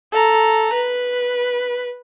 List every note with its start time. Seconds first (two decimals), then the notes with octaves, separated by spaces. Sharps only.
0.13 A4 A#5
0.73 B4